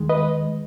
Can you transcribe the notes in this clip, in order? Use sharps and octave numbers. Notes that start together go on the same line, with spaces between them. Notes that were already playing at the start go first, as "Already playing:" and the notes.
Already playing: D#2 D#3 G#3
B4 D#5